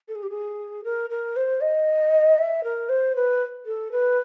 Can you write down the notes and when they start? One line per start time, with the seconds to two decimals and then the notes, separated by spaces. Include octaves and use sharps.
0.08 A4
0.15 G#4
0.23 G4
0.30 G#4
0.84 A#4
1.10 A#4
1.36 C5
1.61 D#5
2.38 E5
2.63 A#4
2.89 C5
3.15 B4
3.66 A4
3.91 B4